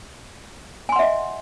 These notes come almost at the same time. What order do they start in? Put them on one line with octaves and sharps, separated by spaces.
G#5 C6 F#5 E5 D#5